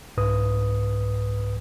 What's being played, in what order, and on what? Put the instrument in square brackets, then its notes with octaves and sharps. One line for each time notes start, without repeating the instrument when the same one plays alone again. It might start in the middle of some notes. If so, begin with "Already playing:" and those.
[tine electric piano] C2 G#2 B4 D#6